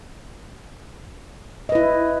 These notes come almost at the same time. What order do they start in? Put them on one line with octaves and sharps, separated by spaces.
D#5 B4 E4